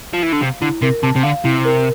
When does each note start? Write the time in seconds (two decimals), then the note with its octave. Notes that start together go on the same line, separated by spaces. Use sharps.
0.13 F3
0.23 E3
0.32 D3
0.41 C3 F5
0.62 D3 E4
0.82 C3 A#4
1.03 C3 A5
1.16 C3
1.23 D3 F5
1.45 C3 E4
1.65 A#4